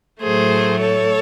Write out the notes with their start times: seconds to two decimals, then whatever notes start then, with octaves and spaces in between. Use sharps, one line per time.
0.22 A2 F#3 A3 G#4 C5
0.81 A4 C#5